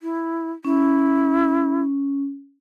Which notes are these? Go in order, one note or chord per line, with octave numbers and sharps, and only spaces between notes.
E4
C#4 E4